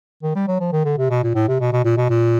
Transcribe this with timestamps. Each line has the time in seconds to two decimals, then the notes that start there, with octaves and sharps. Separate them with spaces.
0.23 D#3
0.36 G3
0.48 F#3
0.60 F3
0.72 D#3
0.85 D3
0.98 C3
1.10 B2
1.23 A#2
1.35 A2
1.48 C3
1.60 B2
1.72 B2
1.85 A#2
1.97 B2
2.10 A#2